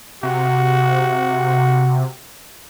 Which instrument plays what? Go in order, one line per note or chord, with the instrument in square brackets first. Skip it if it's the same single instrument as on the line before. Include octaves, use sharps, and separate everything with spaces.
[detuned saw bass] C3 [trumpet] F#4